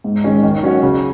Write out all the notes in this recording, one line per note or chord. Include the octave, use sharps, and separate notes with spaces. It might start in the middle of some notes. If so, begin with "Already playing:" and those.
G#2
D#3 G#3 C#4
D#3
F#3 C#4 F#4 C#5
C#3